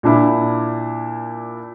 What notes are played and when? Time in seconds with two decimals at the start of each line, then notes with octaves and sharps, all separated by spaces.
0.03 A#2 D4 E4